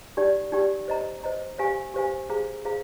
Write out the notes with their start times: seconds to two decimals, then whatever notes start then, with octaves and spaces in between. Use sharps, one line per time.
0.17 D#4 G4 D5 G5
0.52 D#4 G4 D5 G5
0.88 C5 D#5 A#5
1.24 C5 D#5 A#5
1.59 G4 C5 F5 G#5
1.94 G4 C5 F5 G#5
2.29 G#4 C5 F5 A#5
2.65 G#4 C5 F5 A#5